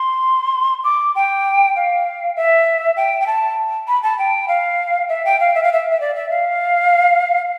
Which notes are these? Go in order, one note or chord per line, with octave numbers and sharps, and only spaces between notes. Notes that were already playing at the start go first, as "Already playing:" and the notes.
Already playing: C6
D6
G5
F5
E5
G5
G5
A5
B5
A5
G5
F5
E5
G5
F5
E5
F5
E5
E5
D5
E5
F5